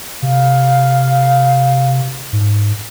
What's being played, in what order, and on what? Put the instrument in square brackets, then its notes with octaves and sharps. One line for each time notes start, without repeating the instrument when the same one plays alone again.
[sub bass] C3 [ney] F5
[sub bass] G#2